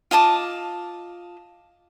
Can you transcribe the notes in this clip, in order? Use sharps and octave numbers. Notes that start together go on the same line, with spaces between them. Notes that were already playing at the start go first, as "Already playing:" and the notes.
F4 D#5 A5 D6